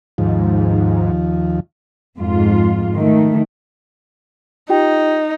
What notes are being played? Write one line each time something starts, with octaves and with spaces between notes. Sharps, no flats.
D#2 G#2 F3
F2 G#2 F4
D#3 A3
D#4 F4 G4 G5